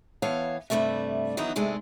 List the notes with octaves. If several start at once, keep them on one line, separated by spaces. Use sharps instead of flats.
E3 B3 C#5 F5 A5
G2 C3 F3 G3 A3 E5
D#3 E3 F#3 B3 D#4 E4
G#2 C3 G#3 A3 D4